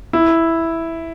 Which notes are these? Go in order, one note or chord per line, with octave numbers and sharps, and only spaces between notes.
E4